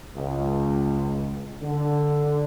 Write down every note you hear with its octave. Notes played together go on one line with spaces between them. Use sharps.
C#2
D3